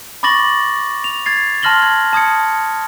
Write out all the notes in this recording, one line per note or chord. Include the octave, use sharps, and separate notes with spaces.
B5 C#6 D6 A6 A#6 F#7
F7
G#6 A6 C7
A5 C6 F6 A#6 F#7 G7
G#6
A5 D#6 G#6 C#7